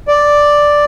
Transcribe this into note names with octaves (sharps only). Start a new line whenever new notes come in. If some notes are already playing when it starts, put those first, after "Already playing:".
D5